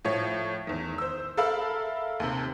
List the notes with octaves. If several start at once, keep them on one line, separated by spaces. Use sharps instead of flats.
A2 F3 C#5
E2 D#3
C5 E6
A4 A#4 E5 F5 B5 E6
D#2 C3